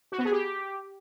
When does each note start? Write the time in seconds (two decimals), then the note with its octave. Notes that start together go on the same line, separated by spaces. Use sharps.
0.12 F#4
0.18 B3
0.25 G#4
0.32 G4